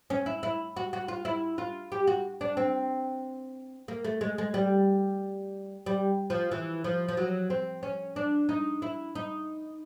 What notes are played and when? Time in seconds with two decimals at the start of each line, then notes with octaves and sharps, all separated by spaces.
0.10 C#4
0.26 E4
0.43 E4
0.77 F#4
0.93 F#4
1.08 F4
1.25 E4
1.58 F4
1.92 G4
2.07 F#4
2.41 D4
2.57 C4
3.88 A#3
4.04 A3
4.21 G#3
4.38 G#3
4.54 G3
5.86 G3
6.30 F3
6.51 E3
6.84 F3
7.08 F3
7.17 F#3
7.50 C4
7.83 C#4
8.16 D4
8.49 D#4
8.82 E4
9.15 D#4